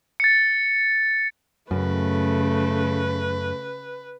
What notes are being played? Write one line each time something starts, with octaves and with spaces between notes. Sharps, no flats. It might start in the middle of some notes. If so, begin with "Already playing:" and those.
A6 C#7
F#2 C#3 A3 B4